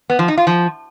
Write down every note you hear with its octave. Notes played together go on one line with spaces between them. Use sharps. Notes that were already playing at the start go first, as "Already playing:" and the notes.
B3
F3
D#4
F4
F3